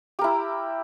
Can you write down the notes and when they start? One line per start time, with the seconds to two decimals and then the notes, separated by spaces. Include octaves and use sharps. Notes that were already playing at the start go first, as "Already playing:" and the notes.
0.19 G4
0.21 A#4
0.24 E4